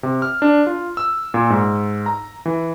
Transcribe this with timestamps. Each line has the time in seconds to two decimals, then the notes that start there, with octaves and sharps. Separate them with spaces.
0.03 C3
0.22 F6
0.42 D4
0.67 F4
0.97 E6
1.34 A#2
1.50 G#2
2.06 A#5
2.46 E3